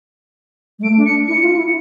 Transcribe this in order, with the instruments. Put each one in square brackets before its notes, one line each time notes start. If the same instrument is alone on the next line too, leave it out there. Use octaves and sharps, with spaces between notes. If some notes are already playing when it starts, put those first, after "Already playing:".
[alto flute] G#3
[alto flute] A3 [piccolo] D7
[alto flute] D4
[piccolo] C#7
[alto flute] E4 [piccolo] C#7
[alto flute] F4
E4